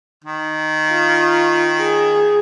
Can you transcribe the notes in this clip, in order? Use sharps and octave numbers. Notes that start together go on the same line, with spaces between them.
D#3
F4
G#4